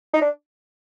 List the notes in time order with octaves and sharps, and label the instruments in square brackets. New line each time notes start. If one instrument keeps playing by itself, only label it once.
[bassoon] D#4
D4